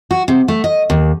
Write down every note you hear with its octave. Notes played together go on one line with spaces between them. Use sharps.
F#4
C3
A3
D#5
D#2